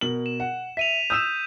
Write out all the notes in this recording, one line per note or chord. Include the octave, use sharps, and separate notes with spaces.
B2 A#4 F#7
E7
F#5
E5 B6 D#7 F7
D#6 E6 G6 E7